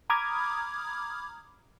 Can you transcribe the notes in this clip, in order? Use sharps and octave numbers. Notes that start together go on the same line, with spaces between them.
A#5 B5 D6 D#6 F6 G#6